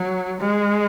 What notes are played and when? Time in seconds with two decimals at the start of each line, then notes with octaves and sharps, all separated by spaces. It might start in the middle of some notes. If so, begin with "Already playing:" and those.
Already playing: F#3
0.41 G#3